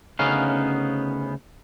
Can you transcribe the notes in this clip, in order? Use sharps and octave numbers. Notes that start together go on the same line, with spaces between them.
D2 C#3 B3 C#4 D#4 F5